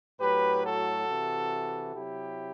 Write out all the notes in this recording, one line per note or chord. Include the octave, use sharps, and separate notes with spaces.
A2 F#3 G4 B4
F#4 A4
C3 E3
C3 F#3 E4 G4